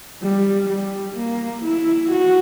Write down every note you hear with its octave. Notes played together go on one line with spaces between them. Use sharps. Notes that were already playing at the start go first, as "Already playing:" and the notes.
G3
G3
A#3
E4
F#4